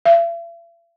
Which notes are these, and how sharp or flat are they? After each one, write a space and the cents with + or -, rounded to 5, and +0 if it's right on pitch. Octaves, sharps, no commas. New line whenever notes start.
E5 +45